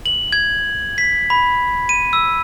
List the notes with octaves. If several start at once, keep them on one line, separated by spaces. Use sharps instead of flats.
F#7
G#6
B6
B5
D#7
E6